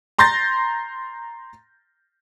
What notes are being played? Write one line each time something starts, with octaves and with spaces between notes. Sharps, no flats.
A#5 C6 G6 A6 A#6